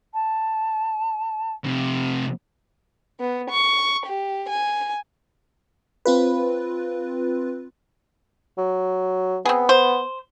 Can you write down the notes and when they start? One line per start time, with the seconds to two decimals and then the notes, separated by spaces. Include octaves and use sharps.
0.14 A5
1.64 F2 C3
3.20 B3
3.50 C#6
4.06 G4
4.49 G#5
6.05 C4 F4 B4
8.58 F#3
9.45 B3 C4 G#4
9.69 C5